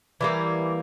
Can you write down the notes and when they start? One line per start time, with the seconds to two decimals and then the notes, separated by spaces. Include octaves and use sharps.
0.21 E3 G3 A#3